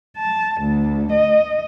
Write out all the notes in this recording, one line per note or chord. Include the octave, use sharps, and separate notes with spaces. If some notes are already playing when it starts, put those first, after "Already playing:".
A5
D2
D#5